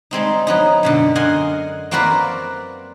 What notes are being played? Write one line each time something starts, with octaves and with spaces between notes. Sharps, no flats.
G3 G#3 C4 D#4
F#3 B3 D#4
F#2 B2 D3
A#4 D#5 F#5 G#5 A#5 C6
A#3 C4 F#4 A#4 B4 D5